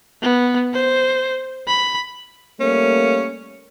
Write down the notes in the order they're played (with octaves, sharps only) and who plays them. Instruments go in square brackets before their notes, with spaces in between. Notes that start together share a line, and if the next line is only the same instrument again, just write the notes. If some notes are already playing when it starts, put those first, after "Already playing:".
[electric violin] B3
C5
B5
[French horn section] G3 A3 A#3 [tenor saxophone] C#4